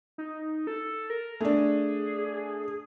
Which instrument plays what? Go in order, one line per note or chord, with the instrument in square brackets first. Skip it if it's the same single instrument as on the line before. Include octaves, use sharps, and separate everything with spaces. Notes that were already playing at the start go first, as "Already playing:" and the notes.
[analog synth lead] D#4
A4
A#4
[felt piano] A3 D4 [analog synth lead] G#4